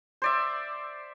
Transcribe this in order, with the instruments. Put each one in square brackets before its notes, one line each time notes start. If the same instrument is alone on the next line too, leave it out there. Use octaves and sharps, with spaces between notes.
[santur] C5 D5 E5